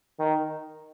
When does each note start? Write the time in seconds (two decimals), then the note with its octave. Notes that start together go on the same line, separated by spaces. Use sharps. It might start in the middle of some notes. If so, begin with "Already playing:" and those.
0.19 D#3